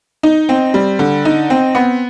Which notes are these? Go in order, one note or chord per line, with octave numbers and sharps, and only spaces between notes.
D#4
C4
G3
D3
D#4
C4
B3